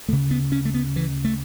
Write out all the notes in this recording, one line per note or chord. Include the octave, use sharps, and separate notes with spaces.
D2 C#3 A3
B3
C#4
A3
B3
E3
A3